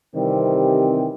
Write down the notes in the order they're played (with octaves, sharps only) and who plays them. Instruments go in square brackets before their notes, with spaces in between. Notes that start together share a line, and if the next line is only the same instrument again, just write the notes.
[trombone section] C3 D#3 E3 G3 C4 G4